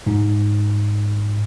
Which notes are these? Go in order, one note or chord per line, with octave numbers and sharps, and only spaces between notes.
G#2